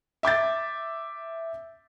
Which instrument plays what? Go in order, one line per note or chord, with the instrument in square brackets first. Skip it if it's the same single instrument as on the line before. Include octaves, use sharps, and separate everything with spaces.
[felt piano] E5 D6 G6 A6